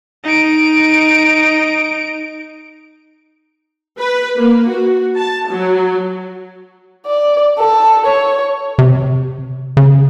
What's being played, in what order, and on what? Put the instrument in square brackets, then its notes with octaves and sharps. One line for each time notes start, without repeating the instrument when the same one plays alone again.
[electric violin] D#4 D7
[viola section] B4
A#3
F#4
A5
F#3
[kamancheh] D5
A4
C#5
[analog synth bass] C3
C#3